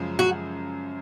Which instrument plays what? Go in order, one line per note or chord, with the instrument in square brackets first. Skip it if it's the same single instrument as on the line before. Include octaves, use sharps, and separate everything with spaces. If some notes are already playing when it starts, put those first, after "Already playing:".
Already playing: [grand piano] F#2 C#3 F3 G#3
[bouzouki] F#4